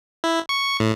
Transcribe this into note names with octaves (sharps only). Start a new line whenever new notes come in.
E4
C#6
A2